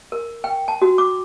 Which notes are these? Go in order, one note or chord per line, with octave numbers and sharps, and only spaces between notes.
A#4
G5
A5
F#4
D6